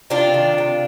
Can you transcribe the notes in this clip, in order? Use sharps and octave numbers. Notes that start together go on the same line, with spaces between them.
C3 D4 F4
D#3
C3